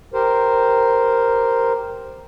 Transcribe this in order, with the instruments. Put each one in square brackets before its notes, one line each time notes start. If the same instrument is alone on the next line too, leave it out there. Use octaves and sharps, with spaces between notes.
[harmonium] G4 A#4 C5